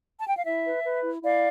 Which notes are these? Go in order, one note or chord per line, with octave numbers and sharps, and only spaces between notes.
A5
G5
F5
E4 E5
B4
B4
E4
E4 D5 F5